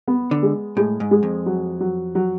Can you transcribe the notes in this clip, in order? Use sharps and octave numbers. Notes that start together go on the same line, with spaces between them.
B3
D3
G#3
A2 G#3
G#2
G#3
F2
F#3
F#3
F#3